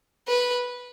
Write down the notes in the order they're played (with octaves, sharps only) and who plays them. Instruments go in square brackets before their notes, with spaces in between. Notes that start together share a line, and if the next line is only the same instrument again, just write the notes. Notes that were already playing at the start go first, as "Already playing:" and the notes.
[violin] B4